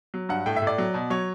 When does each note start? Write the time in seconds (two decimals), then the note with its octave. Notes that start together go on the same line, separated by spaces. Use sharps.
0.14 F#3
0.29 G2 F#5
0.46 A2 G5
0.56 E5
0.62 A2
0.67 D5
0.78 F#3
0.94 B2
1.10 F#3 C#5